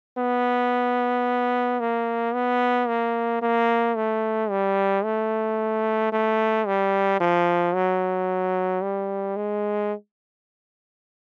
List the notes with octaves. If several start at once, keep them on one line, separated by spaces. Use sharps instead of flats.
B3
A#3
B3
A#3
A#3
A3
G3
A3
A3
G3
F3
F#3
G3
G#3